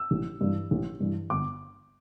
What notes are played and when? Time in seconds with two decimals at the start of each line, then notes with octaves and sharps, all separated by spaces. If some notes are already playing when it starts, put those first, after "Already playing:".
Already playing: E6
0.11 A1
0.41 G2 E3
0.71 A1
1.00 G2 E3
1.30 G1 D6